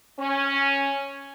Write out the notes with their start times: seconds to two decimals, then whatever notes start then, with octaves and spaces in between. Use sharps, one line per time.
0.20 C#4